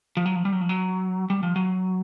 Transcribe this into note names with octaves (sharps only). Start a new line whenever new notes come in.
F3
F#3
F3
G3
F#3
F3
F#3
G3
F3
F#3